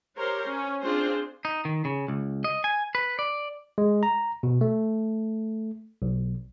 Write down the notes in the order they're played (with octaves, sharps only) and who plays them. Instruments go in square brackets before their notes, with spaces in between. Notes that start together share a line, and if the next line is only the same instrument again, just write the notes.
[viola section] G4 A#4 C5 C#5
C#4
C4 D4 F4 G#4 C5
[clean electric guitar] D#4
D#3
C#3
C#2
D#5
G#5
B4
D5
[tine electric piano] G#3
A#5
B2
A3
B1